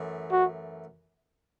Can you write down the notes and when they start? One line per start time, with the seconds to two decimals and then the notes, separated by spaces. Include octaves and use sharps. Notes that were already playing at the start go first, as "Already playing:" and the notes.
Already playing: F#2 E3 A3
0.32 F#4